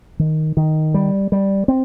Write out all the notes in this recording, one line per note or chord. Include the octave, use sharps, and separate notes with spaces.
D#3
D#3
G3
G3
C4